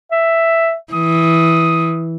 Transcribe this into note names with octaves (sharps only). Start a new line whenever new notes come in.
E5
E3 D#6